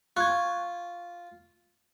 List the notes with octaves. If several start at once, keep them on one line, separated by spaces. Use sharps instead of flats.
F4 C#6 F#6 G#6